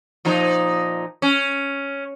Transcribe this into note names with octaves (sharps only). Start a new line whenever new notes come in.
A#2 F3 D#4
C#4